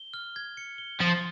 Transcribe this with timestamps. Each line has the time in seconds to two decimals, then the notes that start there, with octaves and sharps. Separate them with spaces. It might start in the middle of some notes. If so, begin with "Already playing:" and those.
Already playing: G7
0.14 F6
0.36 G#6
0.57 C#7
0.78 G7
1.00 F3 D#6